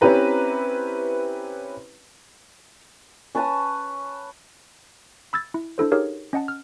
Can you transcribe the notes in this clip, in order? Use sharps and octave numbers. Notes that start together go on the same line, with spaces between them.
C4 C#4 E4 G4 B4 A#5
C#4 B4 A5 D#6
B5 E6 G#6 A6
E4
D4 E4 A4 C5
D#4 G4 G#4 A#4 C#5 F5
C#4 D#5 F#5 A5
F6